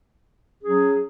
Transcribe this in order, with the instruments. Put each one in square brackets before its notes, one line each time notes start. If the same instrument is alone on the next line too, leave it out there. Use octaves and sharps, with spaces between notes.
[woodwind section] F#3 C#4 G#4